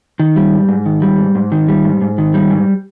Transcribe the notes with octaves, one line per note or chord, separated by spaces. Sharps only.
D#3
G3
G#2
G#2
D#3
G3
G#2
G#2
D#3
G3
G#2
G#2
D#3
G3
G#2